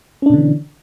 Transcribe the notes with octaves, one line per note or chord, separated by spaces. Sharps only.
B2 D3 E3 C#4 D4